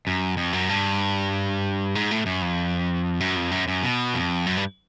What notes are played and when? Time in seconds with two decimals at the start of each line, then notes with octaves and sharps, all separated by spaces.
0.07 F#2
0.37 F2
0.53 F#2
0.69 G2
1.95 G#2
2.11 A2
2.26 F#2
2.42 F2
3.20 F#2
3.36 F2
3.51 F#2
3.68 F#2
3.83 B2
4.14 F2
4.46 F#2
4.57 G2